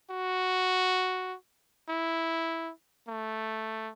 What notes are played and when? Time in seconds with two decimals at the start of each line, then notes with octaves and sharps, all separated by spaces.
0.11 F#4
1.89 E4
3.08 A3